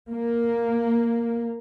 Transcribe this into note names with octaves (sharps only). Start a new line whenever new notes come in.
A#3